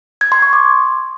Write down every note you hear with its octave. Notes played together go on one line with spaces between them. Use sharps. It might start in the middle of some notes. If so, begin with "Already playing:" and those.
G#6
C6
C#6
D6